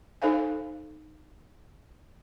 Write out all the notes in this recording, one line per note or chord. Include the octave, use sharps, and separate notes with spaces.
D#4 A4 C5 F5 G#5